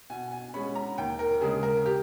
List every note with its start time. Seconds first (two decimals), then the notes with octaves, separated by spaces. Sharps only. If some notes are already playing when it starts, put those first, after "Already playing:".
0.10 B2 G#5
0.31 G#5
0.54 G#3 C#4 B5
0.75 A#5
0.98 D#2 G5
1.19 A#4
1.41 C#3 G#3 G#4
1.63 A#4
1.86 G4